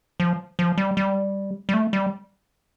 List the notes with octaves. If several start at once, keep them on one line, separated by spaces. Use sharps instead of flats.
F3
F3
G3
G3
G3
A3
G3